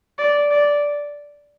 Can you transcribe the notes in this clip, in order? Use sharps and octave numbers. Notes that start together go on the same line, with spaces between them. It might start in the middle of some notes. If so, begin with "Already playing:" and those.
D5
D5